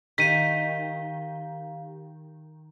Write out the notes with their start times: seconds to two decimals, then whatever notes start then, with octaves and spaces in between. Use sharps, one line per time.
0.18 D#3 G4 F5 B6 D#7